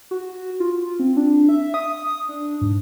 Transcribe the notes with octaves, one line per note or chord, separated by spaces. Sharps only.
F#4
F4
C4
D4
E5
D#6
D4
G#2